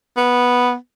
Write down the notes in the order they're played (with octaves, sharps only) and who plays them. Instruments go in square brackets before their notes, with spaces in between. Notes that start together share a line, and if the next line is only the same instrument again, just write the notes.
[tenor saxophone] B3